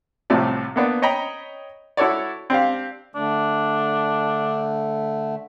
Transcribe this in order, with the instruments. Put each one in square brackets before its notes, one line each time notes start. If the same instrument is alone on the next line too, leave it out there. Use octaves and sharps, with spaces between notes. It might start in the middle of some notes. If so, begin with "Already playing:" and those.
[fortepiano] C2 A2 C3 F3 D5
A#3 B3 D4
C#5 D#5 G5 A#5 B5
E4 F#4 A4 C#5 D5
C4 D4 G4 F5
[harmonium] D3 A3 [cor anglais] D4